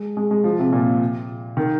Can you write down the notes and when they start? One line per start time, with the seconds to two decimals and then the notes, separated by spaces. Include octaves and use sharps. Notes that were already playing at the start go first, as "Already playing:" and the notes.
Already playing: G#3
0.17 G#3
0.31 G#3
0.44 F3
0.59 C3
0.72 A#2
1.57 D#3